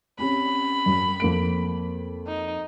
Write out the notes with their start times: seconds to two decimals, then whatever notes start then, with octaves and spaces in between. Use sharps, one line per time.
0.19 C4 C#4 G4 B5
0.86 F#2
1.20 F2 A#3 D7
2.27 D#4